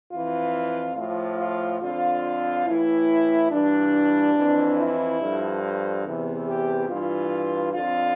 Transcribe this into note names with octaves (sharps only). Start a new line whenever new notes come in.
F2 E3 F4
A2 F3 F4
F4
F2 D3 F3 F4
A2 E3 E4
G2 E3 D4
F2 E3
E4
G2 D3 F3
E2 C3 E3
G4
G2 E3 F4
F2 D3 F3 F4